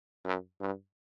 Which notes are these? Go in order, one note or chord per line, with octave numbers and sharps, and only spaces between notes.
F#2
G2